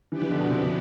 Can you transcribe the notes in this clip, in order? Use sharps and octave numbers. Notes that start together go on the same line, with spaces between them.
E3 F3 B3 D4 G4 B4
E3
D3
B2
C3